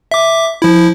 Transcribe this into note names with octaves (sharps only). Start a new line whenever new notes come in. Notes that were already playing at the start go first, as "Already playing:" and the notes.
E5 D6
F3 E4